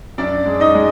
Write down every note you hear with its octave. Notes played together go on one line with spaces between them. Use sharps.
F#2 D4 D5
G#3
D#4 D#5
G#3